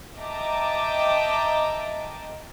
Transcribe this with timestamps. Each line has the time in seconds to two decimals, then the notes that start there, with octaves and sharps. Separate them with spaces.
0.17 D#5 E5 G5 A5 A#5 D6